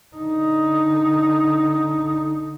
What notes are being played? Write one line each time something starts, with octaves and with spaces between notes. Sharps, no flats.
D3 D#4